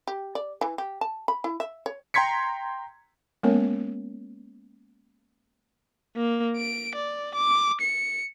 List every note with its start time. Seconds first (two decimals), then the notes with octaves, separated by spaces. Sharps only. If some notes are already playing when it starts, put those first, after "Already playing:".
0.07 G4
0.35 D5
0.61 E3
0.78 G4
1.01 A5
1.28 B5
1.44 E4
1.60 E5
1.86 C#5
2.14 G5 A#5 C6 G#6 B6 C#7
3.43 G#3 A#3 B3 C#4 A#4 C#5
6.16 A#3
6.57 D7
6.96 D5
7.35 D6
7.81 C#7